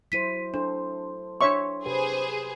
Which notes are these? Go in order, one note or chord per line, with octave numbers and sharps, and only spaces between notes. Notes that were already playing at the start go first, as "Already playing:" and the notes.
F#3 E4 C5 B6 D#7
D4 A4 C5
D4 C#5 E5 C6 C#6
C3 G4 G#4 B4 C5